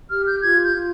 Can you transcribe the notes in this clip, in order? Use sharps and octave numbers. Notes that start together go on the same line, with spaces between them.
G4 F6
G6
F4 G#6
G6
F4